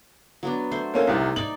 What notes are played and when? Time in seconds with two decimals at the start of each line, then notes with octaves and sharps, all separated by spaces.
0.43 F#3 B3 D4
0.71 A3 C5
0.94 A#3 C#4 A4
1.07 C2 C3 D#4 D5
1.36 D#4 D5 F#7